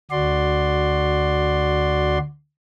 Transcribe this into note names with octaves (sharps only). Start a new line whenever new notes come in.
D2 F#4 D5 C6